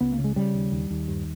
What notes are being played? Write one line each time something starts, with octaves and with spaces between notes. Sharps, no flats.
C#2 B3
A#3
C#3
G#3
C#3 G3
D#2
D#2
D#2
G2